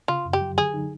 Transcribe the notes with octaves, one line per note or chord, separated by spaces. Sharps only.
C#3 F4
F#2
G4
F#3
D3 G#4
D#4